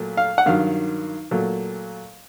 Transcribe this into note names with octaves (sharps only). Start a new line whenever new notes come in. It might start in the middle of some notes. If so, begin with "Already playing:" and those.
Already playing: A#2 F#3 A3
F5
F#5
G2 D#3 F#3 F5
A#2 F#3 A3